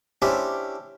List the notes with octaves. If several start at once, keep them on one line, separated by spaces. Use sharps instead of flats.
C#4 D4 E4 G4 C5